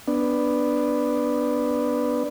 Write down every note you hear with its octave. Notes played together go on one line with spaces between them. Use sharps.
B3 D4